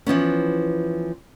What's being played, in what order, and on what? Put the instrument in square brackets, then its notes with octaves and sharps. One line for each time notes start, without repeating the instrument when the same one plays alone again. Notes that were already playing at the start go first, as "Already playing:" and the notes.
[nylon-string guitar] E3 F3 B3 C#4